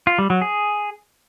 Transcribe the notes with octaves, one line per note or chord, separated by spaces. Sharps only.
F4
G3
F#3
G#4